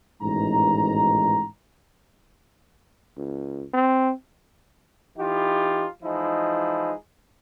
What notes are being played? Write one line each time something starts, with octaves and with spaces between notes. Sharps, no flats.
A1 G#2 B2 D#3 A#5
C#2
C4
E3 D#4 F4 G4
E3 F3 G#3 D#4 E4